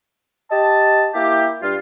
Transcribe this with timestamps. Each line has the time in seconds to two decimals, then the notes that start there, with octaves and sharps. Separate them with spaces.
0.51 G4 D#5 A5
1.14 A#3 E4 G4
1.62 G2 F4